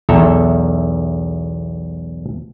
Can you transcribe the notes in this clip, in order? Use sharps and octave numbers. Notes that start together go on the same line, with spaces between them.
B1 E2 A4 E5 A#5